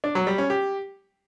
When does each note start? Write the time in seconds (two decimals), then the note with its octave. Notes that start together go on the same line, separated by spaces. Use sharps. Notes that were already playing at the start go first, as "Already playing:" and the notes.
0.04 D4
0.15 F#3
0.27 G3
0.38 C#4
0.50 G4